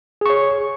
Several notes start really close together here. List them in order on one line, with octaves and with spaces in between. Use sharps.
G#4 C#6 C#5